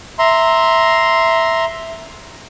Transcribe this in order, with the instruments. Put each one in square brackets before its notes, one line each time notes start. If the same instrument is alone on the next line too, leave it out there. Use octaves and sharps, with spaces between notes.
[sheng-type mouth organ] E5 A#5 C6